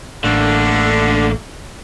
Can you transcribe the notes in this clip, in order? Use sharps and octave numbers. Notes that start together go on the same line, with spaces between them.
A1 D3 A3 A#3